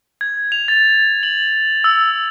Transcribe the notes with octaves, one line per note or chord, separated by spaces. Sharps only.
G#6
F7
A6
F#7
E6